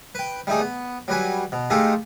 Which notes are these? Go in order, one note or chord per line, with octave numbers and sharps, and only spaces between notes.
B4 G5
G3 A3 D#4 G#4
B3
F#3 G3 B4 G#5
B2
G#3 A3 D#4 F4 G4 A4